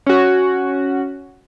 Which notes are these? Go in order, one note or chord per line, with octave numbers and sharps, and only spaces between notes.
C#4 F#4